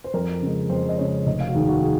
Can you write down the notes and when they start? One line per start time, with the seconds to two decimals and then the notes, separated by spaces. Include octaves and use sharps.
0.04 C5
0.14 F2 A#4
0.42 C#3 G#3
0.70 F2 C5
0.89 D#5
0.98 C#3 G#3 C#5
1.26 F1 D#5
1.40 F5
1.49 F#4
1.55 D#2 D#3 G#4
1.69 F#4
1.83 G#4